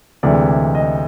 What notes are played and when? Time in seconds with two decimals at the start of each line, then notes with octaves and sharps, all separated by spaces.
0.23 D2 C3 E3 G#3 D5
0.75 D#5